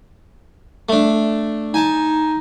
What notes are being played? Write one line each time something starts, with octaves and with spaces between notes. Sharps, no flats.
A3 D4
D#4 G#5 A5